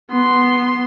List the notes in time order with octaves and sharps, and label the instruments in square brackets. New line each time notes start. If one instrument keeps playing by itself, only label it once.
[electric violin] B3 C6